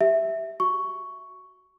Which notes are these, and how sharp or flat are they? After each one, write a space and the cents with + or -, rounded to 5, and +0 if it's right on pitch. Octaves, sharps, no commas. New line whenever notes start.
G4 +0 E5 +0
F#4 +0 C#6 +5